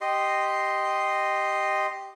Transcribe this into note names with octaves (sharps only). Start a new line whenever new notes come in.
G4 D#5 C6